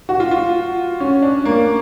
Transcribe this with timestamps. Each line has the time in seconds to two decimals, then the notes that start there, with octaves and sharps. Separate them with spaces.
0.09 F#4
0.20 F4
0.31 F4
1.00 C#4
1.22 D4
1.45 A#3